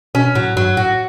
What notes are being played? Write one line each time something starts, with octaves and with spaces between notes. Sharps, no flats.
B2 C#4
A2 F#3
G2 F#3
A2 F#4